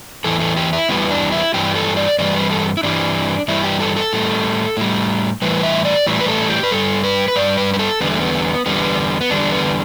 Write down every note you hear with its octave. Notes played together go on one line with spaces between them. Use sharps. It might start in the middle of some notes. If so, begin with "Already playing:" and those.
E2 E3 A4
A4
G4
E4
E2 E3 G3 B3
D4
E4
G2 E3 G3 G4
A4
D5
G2 E3 G3 D5
B4
A4
E4
G2 E3 G3 D4
G2 E3 G3 E4
G4
A4
A4
A2 G3
A2 G3
A2 E3 G3 B4
E5
D5
A2 E3 G3
B4
A4
G4
B4
G2 G3 A4
B4
B4
G2 G3 D5
B4
B4
A4
E2 D3 G3 B3
A3
B3
E2 D3 G3 B3
B3
E2 D3 G3 D4
B3